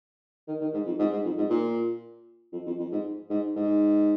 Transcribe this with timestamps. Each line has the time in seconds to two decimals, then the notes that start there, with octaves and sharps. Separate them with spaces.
0.47 D#3
0.61 D#3
0.74 G#2
0.86 F2
0.99 G#2
1.12 G#2
1.25 F2
1.37 G#2
1.50 A#2
2.53 F2
2.66 F2
2.79 F2
2.92 G#2
3.30 G#2
3.56 G#2